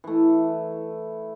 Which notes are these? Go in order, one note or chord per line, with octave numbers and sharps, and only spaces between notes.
E3 A3